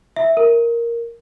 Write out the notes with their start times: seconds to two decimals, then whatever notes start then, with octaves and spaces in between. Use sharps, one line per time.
0.16 E5
0.37 A#4